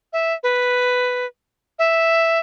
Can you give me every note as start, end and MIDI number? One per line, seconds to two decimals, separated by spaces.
0.13 0.33 76
0.43 1.26 71
1.79 2.39 76